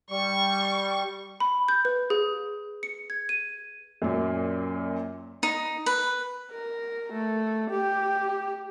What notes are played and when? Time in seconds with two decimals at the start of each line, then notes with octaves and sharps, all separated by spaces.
0.10 G3 C#6
1.40 B5
1.68 G6
1.85 B4
2.10 G#4
2.83 C#7
3.10 G#6
3.29 D#7
4.02 F#2 A#2
5.43 D#4
5.86 B4
6.52 A#4
7.13 A3
7.70 G4